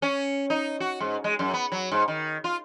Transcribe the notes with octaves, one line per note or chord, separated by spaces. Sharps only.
C#4
D#4
F#4
G#2
G#3
F#2
B3
F#3
G#2
D#3
F4